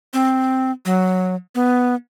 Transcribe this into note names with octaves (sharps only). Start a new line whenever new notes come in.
C4
F#3
B3